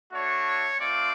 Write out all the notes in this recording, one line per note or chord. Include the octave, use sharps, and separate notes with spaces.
A3 D4 F#4 C#5
A3 C4 F4 D5